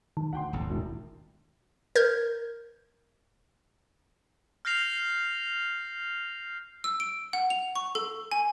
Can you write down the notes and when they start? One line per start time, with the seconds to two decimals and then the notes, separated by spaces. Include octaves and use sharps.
0.17 D#3
0.33 D2 F#5 G5 C6
0.53 D#1 G#1 D#2
0.70 E1 E4
1.95 A#4 G6 G#6
4.65 F6 G6 A#6 C7 F7
6.84 E6
7.00 D7
7.33 F#5
7.50 F7
7.76 C#6
7.95 A4
8.31 G#5